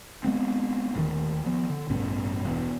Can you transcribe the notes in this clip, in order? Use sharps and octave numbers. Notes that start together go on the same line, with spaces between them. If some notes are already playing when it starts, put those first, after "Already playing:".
G#3 B3 C4
D#1 A1 D2 D#3
F3 B3
D3
A1 G2 B2 C#4
E1 E2